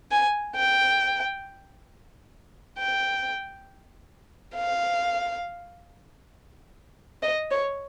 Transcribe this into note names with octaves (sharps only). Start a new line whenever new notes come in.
G#5
G5
G5
F5
D#5
C#5